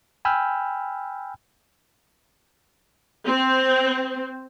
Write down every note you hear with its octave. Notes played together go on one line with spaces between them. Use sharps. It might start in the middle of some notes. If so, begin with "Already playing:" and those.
G5 G#5 B5 E6 F6 G6
C4